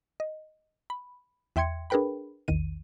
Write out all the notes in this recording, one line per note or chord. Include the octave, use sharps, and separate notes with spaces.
D#5
B5
E2 E5 G5 C6 G#6 C#7
D4 G#4 A#4 B4 G5 B5
A#1 E2 D#3 D#7